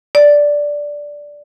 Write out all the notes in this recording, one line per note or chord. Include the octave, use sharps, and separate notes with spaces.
D5